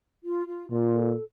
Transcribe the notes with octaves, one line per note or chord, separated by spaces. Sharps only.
F4
F4
A#2 F4
A4